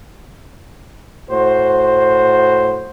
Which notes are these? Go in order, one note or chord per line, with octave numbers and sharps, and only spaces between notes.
A2 F#4 C5